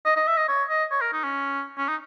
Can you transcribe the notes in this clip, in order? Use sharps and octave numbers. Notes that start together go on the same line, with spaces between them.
D#5
D#5
E5
D#5
C#5
D#5
C#5
A#4
D#4
C#4
C#4
D#4